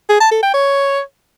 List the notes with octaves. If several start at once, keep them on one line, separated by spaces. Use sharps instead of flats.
G#4
A5
A4
G5
C#5